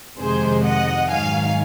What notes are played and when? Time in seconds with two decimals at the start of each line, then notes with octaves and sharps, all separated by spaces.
0.19 F2 C3 D#3 G#3 G#4 C5
0.64 D#5 F#5
1.09 G#2 D#3 F#3 F5 G#5